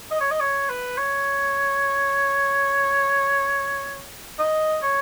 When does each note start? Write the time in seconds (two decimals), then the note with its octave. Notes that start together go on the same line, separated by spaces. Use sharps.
0.11 D#5
0.21 C#5
0.31 D#5
0.40 C#5
0.69 B4
0.97 C#5
4.39 D#5
4.83 C#5